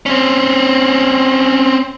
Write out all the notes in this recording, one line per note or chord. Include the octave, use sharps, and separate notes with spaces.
C4 C#4